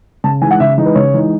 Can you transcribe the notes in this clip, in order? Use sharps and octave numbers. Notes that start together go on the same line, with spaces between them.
C#3 A5
E3 G#3 D#4 G#5
F#5
C#3 E5
E3 G#3 D#4
B4
C#3 C#5
E3 G#3 D#4